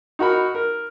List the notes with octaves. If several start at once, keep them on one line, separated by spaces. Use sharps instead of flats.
D#4 F#4 A#4 B5
A#4